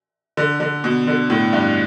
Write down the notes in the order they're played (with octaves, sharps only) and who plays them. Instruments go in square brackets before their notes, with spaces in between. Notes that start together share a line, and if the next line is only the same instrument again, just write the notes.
[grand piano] D3
D3
B2
D3
A2
G2